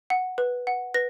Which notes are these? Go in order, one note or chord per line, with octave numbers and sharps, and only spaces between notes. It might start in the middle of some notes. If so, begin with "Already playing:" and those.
F#5
B4
F#5
B4 A#6